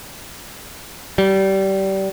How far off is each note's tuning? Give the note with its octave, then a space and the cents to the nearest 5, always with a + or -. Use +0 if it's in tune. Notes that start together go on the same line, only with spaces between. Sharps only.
G3 -25